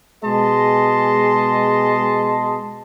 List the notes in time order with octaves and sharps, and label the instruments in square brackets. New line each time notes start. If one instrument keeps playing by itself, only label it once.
[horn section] B2 G#3 G#4 D#5 A5 C6